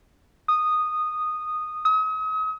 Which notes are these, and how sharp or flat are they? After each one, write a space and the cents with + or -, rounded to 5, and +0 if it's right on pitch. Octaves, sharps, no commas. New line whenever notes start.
D#6 -10
D#6 +40